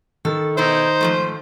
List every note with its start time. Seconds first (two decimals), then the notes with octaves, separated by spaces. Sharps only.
0.25 D#3 A4
0.57 B2 D#4 E4 A#4 C5
1.01 G#2 F3 A3